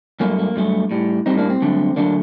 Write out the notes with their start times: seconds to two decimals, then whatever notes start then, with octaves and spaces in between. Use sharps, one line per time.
0.20 G2 F#3 A3 A#3
0.39 A#3
0.56 G2 F#3 A3
0.91 A2 G3
1.26 A2 G3 C4 D#4
1.37 A#3 D4
1.50 C4
1.62 G2 D3 F#3 A3
1.96 D3 F#3 A3 A#3 D4